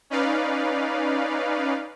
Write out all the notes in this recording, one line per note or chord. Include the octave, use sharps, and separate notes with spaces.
C#4 D#4 B4 D5 F5